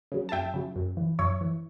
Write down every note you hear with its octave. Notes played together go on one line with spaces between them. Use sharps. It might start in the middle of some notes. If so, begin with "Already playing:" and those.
C#3 F#3
A5
F#2 E5 G5
C#3 F#3
F#2
E3
F#2 C#5 E5
E3